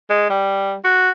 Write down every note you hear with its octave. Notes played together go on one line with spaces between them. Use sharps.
G#3
G3
F#4